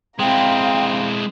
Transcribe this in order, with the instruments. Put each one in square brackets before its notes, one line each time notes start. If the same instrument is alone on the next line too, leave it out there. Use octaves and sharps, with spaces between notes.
[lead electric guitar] G#3 E4 [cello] C4 [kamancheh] F5 A#5 [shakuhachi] G5